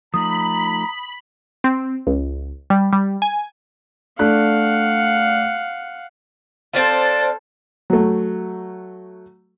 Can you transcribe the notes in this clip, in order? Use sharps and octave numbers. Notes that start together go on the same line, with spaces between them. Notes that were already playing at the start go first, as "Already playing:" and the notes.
F3 A3 D#4 A#5 B5 D#6
C4
C#2
G3
G3
G#5
A3 D4 F5 F#5 F#6
C4 D4 F4 A4 C5
F#3 A3